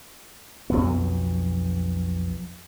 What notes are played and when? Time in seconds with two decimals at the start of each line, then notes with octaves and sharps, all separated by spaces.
0.70 B1 F2 B3